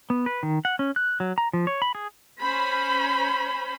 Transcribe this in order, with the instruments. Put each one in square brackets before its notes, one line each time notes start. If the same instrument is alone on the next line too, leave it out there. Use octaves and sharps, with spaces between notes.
[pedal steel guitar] B3
B4
D#3
F#5
C#4
F#6
F#3
A#5
F3
C#5
B5
G#4
[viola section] C#4 C5 B5